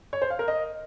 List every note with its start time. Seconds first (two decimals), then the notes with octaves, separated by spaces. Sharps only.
0.13 C#5
0.22 C5
0.30 F5
0.39 A#4
0.48 D#5